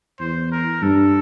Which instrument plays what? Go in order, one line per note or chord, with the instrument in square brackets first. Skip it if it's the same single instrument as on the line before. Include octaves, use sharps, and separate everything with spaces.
[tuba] E2 [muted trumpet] C5
[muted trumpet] A#4
[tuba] G2 [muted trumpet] A4